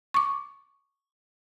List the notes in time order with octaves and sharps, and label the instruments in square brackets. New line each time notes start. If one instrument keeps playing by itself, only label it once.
[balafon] C#6 D6